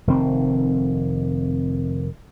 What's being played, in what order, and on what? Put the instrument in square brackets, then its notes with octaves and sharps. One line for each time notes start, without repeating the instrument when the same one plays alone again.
[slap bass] F1 D#3 C4